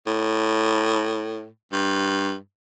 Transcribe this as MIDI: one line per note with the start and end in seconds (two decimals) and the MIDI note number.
0.07 1.46 45
1.72 2.35 43